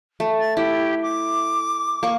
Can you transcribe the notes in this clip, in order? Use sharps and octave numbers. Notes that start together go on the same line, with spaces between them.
A3
A6
E4 G4
D6
A#3 C#6